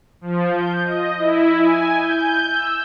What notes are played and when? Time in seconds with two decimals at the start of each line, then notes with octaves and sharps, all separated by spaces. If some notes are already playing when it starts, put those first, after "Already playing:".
0.21 F3
0.51 G6
0.83 D#5
1.18 E4
1.57 G#5
1.95 G6
2.51 E6